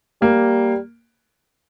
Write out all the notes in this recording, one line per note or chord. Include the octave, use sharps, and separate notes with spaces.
G3 A#3